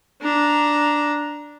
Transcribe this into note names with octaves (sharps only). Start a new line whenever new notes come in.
D4 A#5